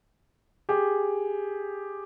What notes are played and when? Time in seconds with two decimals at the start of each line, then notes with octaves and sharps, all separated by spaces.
0.69 G4 G#4